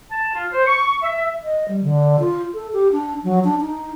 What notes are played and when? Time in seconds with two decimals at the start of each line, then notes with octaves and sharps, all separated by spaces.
0.11 A5
0.34 F4
0.52 C5
0.66 C#6
1.02 E5
1.43 D#5
1.68 G3
1.83 D3
2.19 F4
2.54 A4
2.73 G4
2.92 D4
3.24 F#3
3.44 D4
3.61 D#4